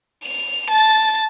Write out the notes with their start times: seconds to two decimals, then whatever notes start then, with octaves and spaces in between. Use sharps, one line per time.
0.23 F7
0.70 A5 A6